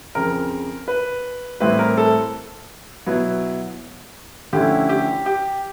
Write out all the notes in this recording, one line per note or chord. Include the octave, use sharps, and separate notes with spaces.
F2 C#3 F3 A#4
B4
A2 E3 G3 C4 E4 B4
A#4
A4
B2 F#3 B3 E4
D3 F3 A3 C#4 E4 G4
G4
G4